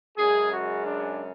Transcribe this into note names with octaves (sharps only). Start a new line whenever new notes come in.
F#2 C#3 G#3 G#4
F#4
D4